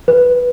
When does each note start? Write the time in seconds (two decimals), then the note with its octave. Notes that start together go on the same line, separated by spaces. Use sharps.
0.08 B4